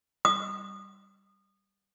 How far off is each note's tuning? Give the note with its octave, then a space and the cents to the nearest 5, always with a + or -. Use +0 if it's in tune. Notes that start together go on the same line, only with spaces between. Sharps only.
D#6 -30